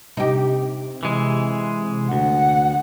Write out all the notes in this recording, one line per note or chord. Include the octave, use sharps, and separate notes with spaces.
C3 D#4 G4
E3 G#3
D2 F#5